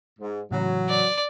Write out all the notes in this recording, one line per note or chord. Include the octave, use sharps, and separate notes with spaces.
G#2
A2 C#3 E3 F#3
D5